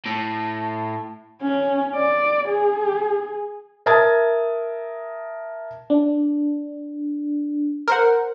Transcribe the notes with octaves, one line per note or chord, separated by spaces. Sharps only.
A2 A5
C#4
D5
G#4
A#4 E5 A5 D#6 G#6 A6
D4
A#4 C5 F#5